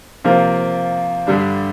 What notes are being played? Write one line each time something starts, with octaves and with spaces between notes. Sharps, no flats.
C3 F3 A#3 F4 A#4
G2 D3 G3 D4